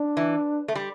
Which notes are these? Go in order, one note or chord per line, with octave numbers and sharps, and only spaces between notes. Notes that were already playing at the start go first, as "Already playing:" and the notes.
Already playing: D4
E3
A3
G3